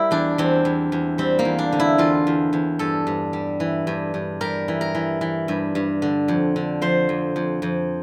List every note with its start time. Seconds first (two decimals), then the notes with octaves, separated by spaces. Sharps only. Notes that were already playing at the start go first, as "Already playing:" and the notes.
Already playing: G3 E4 A#4
0.11 E2 D4
0.38 E2 C4
0.65 E2
0.92 E2
1.18 G3 C4
1.39 A#3
1.45 E2
1.59 D4
1.72 D3
1.80 E4
1.98 E2 F4
2.27 E2
2.53 E2
2.79 G2 A4
3.07 G2
3.33 G3
3.60 E3
3.87 G2
4.14 G2
4.41 G3 A#4
4.68 E3
4.81 A#4
4.95 E3
5.21 E3
5.48 G2
5.75 G2
6.02 D3
6.28 F2
6.56 D3
6.82 F3 C5
7.09 F2
7.36 F2
7.62 F2